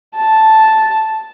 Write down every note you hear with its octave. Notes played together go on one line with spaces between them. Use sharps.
A5